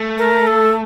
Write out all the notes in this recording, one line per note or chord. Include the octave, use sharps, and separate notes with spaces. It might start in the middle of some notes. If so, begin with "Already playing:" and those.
Already playing: A3
A#4
A4